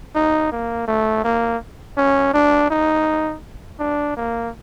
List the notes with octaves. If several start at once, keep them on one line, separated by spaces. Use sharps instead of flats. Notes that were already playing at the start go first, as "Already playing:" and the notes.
D#4
A#3
A3
A#3
C#4
D4
D#4
D4
A#3